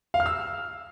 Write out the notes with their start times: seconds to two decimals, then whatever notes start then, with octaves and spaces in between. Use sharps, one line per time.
0.14 F5
0.20 F6
0.26 E6